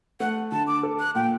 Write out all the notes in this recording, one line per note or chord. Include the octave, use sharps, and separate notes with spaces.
A3 F#5
D3 A5
D6
A4
F#6
A#2 G5